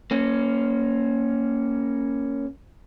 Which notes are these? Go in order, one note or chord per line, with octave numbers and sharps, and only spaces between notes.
A#3 C#4